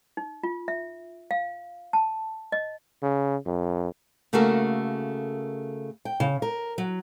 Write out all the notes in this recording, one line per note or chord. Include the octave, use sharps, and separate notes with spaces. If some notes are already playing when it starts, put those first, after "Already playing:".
D#4
F4
E5
F5
A5
D#5
C#3
F2
C#3 A3 A#3 F#4 A4 A#4
G5
C#3
A#4
F#3